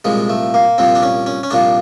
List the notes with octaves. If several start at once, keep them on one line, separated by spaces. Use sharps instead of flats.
C2 A#2 F3 G#3
A3
A#3
C2 A#2 F3 C4
D4
C#4
C#4
C#4
C2 A#2 F3 D4